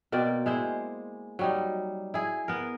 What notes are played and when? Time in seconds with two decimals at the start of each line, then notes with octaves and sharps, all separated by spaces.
0.12 B2 A#3 C4 D5
0.46 G#3 E4 C5
1.39 F#3 G3 D#4
2.14 E4 G#4
2.48 B3 A#4